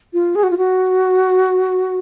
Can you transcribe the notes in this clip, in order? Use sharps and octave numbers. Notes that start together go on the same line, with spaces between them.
F4
G#4
F#4
F4
F#4